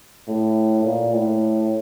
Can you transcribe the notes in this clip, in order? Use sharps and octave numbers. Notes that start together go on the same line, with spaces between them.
A2
A#2
A2